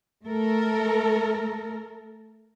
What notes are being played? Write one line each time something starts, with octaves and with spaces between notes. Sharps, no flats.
A3 A4 A#4